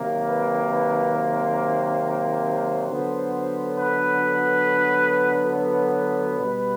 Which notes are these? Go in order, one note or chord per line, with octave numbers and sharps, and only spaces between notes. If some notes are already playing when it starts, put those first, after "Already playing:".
Already playing: C3 D#3 F#3 A#3
B4
B4
C5
D3 F#3 B3
B4
B4
B2 G3 B3